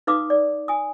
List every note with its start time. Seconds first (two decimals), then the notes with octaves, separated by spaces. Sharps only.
0.07 D#4 B4 F5 D6 D#6
0.30 D5
0.68 G#5 D#6